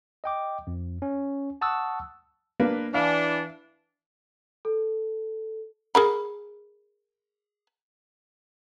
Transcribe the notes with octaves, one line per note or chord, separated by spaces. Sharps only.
D#5 G5 D6
F2
C#4
F#5 A5 C#6 D#6 E6 F#6
A#3 D4 B4
E3 D4 F5
A4
G#4 A#4 B5